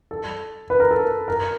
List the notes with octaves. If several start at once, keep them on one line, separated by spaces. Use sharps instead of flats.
A4
B4
A#4
A4
A#4
A#4